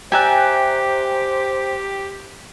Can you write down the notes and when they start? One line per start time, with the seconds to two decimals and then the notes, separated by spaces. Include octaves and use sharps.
0.12 G4 C5 D5 E5 G5 G#5 A#5 F#6